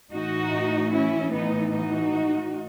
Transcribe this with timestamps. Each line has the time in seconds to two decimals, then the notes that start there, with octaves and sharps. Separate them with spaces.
0.11 A2 E3 D#4 F#4
0.92 C#4 E4
1.33 B3 D#4
1.73 D#4 F#4